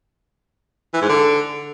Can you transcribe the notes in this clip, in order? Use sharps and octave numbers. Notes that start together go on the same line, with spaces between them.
E3
G#2
D3